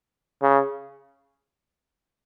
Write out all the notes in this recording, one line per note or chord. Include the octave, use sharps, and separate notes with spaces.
C#3